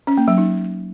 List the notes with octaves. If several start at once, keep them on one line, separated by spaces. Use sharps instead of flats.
C#4
A#3
F#3
D#4